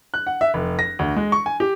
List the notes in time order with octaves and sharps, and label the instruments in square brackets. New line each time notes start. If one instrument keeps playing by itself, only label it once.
[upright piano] F#6
F#5
E5
F1
A#6
D2
G#3
C#6
G#5
G4